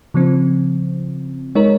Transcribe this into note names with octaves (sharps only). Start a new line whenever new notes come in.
C#3 F3 C4
G#3 D#4 A#4 C#5